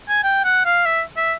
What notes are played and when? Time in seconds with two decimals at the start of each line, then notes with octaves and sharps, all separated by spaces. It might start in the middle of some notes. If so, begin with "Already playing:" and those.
0.09 G#5
0.24 G5
0.44 F#5
0.66 F5
0.86 E5
1.17 E5